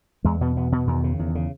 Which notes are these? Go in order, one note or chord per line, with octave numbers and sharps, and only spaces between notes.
E2 G#3
B2 B3
E2 B3
B2 B3
E2 D#3
C#3
E2
C#3